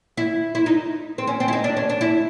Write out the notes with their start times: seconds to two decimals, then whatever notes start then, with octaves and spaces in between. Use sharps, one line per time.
0.17 E4
0.55 E4
0.66 D#4
1.18 C4
1.27 C#4
1.40 C4
1.48 E4
1.53 D#4
1.64 D4
1.77 C#4
1.90 D4
2.01 E4